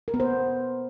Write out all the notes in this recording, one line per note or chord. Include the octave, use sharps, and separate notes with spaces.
A#4
B3
C5